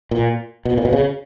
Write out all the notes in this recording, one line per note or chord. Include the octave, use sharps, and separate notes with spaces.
A#2
B2
A#2
B2
C#3